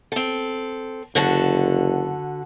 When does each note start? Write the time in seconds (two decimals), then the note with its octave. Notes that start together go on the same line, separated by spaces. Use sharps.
0.12 C4 A4
1.15 F#1 D3 F#4 A5